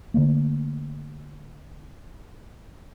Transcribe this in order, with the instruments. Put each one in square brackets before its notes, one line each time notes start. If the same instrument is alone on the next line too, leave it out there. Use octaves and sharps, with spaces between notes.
[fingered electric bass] D3 D#3 A3 A#3